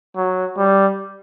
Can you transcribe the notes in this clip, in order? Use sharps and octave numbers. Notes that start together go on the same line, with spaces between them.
F#3
G3